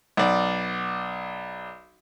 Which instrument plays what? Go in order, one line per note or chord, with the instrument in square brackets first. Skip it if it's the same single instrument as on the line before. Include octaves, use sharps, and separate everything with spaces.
[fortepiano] B1 D5